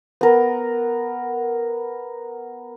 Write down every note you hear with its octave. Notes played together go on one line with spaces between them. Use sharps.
B3 A#4